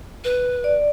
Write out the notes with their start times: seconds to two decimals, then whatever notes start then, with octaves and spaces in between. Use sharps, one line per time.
0.24 B4
0.64 D5